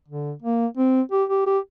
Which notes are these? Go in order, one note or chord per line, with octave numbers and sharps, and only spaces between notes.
D3
A#3
C4
G4
G4
G4